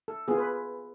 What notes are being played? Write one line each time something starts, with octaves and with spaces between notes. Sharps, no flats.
A4
B3 F4 G#4
B4